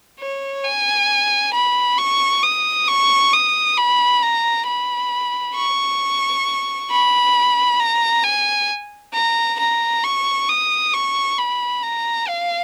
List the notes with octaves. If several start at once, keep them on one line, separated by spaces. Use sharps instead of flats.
C#5
G#5
B5
C#6
D#6
C#6
D#6
B5
A#5
B5
C#6
B5
A#5
G#5
A#5
A#5
C#6
D#6
C#6
B5
A#5
F5